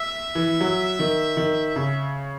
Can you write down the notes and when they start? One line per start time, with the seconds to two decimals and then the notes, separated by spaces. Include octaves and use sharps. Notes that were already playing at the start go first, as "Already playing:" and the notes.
Already playing: E5
0.35 E3
0.61 F#3
0.99 D#3
1.37 D#3
1.76 C#3